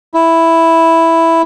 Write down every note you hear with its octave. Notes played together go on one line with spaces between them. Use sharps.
E4